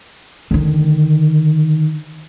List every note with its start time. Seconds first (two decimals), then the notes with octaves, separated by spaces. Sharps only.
0.51 D3 D#3